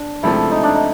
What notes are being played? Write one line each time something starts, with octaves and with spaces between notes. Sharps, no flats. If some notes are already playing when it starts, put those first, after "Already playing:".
Already playing: D4
C#2 C3 F3 A3 E4
D#4
D4
D#4